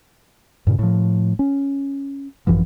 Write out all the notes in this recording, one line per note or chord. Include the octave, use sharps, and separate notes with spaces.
G2 A#2 C#3
A2 F3
C#4
G#1 F#2 E3 F3